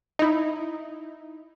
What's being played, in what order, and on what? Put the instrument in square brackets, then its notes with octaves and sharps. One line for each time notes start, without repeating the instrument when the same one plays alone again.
[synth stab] D#4 E4